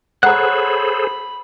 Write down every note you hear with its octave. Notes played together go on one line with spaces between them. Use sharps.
G#4 A4 C5 C#5 F#5 A#5 B5 F#6